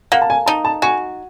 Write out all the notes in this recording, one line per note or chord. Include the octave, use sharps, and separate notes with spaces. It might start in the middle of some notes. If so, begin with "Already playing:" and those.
A#3 F#5
A5
G#5
D#4 A5
A5
F#4 G#5